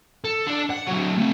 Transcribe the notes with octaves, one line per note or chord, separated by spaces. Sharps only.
A4
D4 D5
F#5
D3 F#3
A3 C4